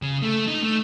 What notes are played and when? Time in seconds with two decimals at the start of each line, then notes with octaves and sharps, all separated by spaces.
0.02 C#3
0.22 A3
0.47 D#4
0.63 A3